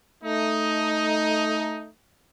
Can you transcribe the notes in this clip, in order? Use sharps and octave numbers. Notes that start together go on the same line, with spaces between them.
A3 D#4